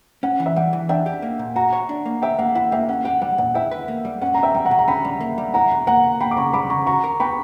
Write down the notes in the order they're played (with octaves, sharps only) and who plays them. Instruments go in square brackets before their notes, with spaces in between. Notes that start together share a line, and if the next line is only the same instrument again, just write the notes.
[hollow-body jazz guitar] C#4 [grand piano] F#5
[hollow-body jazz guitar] E3
[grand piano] E5
[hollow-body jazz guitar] G3 [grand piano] F#5
[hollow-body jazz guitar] E3
[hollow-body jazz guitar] D4 [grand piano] E5 G5
[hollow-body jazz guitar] G4
A#3
A#2
[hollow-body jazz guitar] F#4 [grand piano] F#5 A#5
[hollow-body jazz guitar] C#5
D4
A#3
[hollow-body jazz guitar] G4 [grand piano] E5 G5
[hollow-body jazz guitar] A#3 [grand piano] F#5
[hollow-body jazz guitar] E4 [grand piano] F#5
[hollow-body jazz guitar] A#3 [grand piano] E5 G5
[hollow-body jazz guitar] C#4 [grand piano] F#5
[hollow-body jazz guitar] G4 [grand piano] F#5
[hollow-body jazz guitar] G3 [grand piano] F#5
[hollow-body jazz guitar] A#2 [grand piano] F#5
[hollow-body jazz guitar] E4 [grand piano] E5 G5
[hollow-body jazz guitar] B4
A#3
G3
[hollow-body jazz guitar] C#4 [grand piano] F#5
[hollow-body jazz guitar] B2 [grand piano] A#5
[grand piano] E5 G5
[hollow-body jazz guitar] G3 [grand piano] G5
[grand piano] F#5 A#5
[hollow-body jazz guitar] B2
[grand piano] A#5
[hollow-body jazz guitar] C#4 [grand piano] G5 B5
[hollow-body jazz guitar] G3
A#3
G3
[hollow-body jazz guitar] E4 [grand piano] F#5 A#5
[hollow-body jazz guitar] B2
[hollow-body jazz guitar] A#3 [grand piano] F#5 A#5
[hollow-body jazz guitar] B2
[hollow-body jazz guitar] A#3 [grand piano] G5 B5
[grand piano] D6
[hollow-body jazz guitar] C#3 [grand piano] A#5 C#6
[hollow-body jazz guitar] G3 [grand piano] B5 D6
[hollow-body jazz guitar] C#3 [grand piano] A#5 C#6
[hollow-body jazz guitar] F#4 [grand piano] A#5 C#6
[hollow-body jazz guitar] A#4
[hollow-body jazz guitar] B3 [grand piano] G5 B5